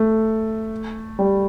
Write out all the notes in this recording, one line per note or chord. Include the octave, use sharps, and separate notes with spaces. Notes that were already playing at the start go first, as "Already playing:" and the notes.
Already playing: A3
G3